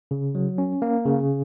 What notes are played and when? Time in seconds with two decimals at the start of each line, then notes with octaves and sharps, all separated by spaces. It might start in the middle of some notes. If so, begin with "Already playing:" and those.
0.11 C#3
0.35 F#3
0.58 C#4
0.82 A#3
1.05 C#3